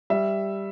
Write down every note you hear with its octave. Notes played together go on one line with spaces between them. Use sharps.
G3 E5